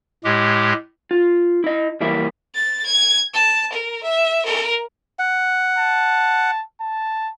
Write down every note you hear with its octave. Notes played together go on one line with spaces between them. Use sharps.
A2 G#3 G4
F4
E4 D#5
E2 G3 A#3 E4
A6
G#6
A5
A#4
E5
A#4
F#5
A5
A5